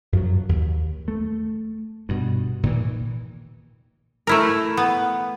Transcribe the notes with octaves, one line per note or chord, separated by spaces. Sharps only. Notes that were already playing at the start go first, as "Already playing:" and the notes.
F#2 F3 F#3
D#2
A3
G2 B2
A#2 D#3 E3
A3 E4 A#4
B3